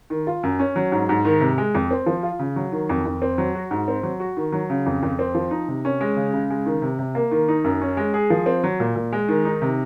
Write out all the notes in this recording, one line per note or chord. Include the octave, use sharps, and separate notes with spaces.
D#3
F4
F#2
C#4
F#3
G#2
G#2
D#3
C3
G#3
F2
C4
F3
F4
C#3
F#3
D#3
F2
F2
C4
F#3
F#4
G#2
C4
F#3
F#4
D#3
F#3
C#3
F2
F2
C4
F3
D#4
C3
C#4
G#3
C#3
C#3
G#3
D#3
C3
C3
A#3
D#3
D#4
F#2
C#4
G#3
G#4
F3
C4
F#3
A#2
A#2
G#3
D#3
D#4
C3